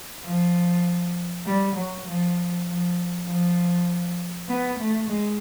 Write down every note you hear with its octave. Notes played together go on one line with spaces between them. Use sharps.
F3
G3
F#3
F3
F3
F3
B3
A3
G#3